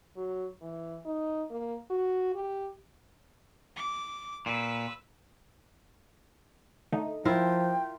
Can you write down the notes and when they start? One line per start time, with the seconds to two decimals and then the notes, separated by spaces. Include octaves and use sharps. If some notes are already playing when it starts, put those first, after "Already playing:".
0.16 F#3
0.62 E3
1.05 D#4
1.51 A#3
1.90 F#4
2.35 G4
3.76 D6
4.46 A#2 B4 E6
6.92 D3 A3 D#4
7.25 F3 E4 F4 A#4 G5